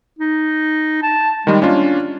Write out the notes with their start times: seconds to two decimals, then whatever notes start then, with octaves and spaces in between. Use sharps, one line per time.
0.19 D#4
1.03 A5
1.47 D#3 G3 G#3
1.62 A#3 C#4 D4 F4